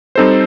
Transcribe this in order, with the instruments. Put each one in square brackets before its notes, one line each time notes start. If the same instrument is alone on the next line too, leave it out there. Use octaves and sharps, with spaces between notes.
[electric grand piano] G3 C4 D#4 A4 C5